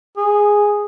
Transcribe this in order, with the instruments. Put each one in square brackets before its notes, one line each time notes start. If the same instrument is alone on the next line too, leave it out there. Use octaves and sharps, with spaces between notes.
[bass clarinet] G#4